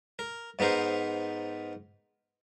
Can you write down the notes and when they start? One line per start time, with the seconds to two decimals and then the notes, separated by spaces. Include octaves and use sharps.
0.19 A#4
0.59 G#2 B3 D#4 A#4 C5